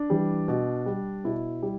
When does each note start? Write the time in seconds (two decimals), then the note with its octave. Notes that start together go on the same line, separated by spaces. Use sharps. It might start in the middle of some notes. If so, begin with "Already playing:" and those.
Already playing: D4
0.10 E3 G3
0.48 B2
0.86 G3
1.24 B2 E4
1.63 G3